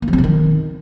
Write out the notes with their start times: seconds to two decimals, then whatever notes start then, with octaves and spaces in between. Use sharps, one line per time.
0.02 A#3
0.08 F3
0.13 C4
0.18 C#3
0.24 D#3